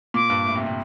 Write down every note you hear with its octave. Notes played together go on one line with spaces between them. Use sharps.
A#2 D6
G2
A2
C3
C3